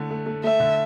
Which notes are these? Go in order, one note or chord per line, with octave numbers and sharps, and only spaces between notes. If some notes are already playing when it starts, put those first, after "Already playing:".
Already playing: D3 A3 E4
A3
A3
A3 E5
D3